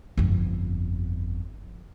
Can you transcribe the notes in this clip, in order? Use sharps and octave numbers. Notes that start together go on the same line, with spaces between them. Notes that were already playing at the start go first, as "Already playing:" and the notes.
G1 F2